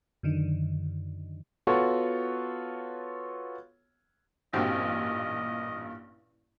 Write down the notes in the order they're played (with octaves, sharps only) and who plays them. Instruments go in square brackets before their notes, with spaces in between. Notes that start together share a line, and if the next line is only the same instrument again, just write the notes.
[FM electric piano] F#2 D3 D#3
[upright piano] B3 F4 F#4 A4 C#5
[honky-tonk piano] A1 G2 A#2 [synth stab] C4 F#4 G4 [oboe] D#5